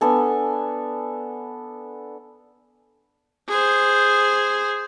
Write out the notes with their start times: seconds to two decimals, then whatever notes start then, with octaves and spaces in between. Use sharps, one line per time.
0.01 B3 D4 A4 G#5
3.49 G#4 C5